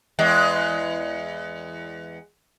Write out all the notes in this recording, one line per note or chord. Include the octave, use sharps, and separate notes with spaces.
E2 G#3